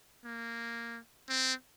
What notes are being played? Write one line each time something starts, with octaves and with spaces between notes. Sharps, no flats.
A#3
C4